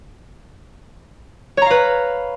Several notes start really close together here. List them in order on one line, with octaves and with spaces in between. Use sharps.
C#5 A#5 F5 B4